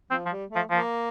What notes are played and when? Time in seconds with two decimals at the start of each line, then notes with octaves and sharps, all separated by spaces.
0.11 F3 C4
0.26 F3
0.31 G3
0.51 F3 A3
0.70 F3 A#3